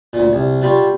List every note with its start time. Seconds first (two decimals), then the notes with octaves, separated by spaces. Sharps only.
0.13 D2 A#2
0.33 C2
0.62 B2 G3 F4